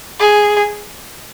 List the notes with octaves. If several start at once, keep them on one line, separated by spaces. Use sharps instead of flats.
G#4